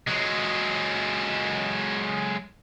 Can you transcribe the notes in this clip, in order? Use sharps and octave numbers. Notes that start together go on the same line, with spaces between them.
F#3 G#3